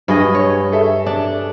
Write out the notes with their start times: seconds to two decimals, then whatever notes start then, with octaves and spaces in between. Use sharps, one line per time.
0.08 G2 G#4 D#5 B5
0.35 C#5
0.72 G#4 A4 E5
1.06 D4